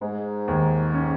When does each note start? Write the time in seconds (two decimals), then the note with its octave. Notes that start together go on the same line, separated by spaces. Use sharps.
0.01 G#2 G#3
0.48 D#2
0.94 C#4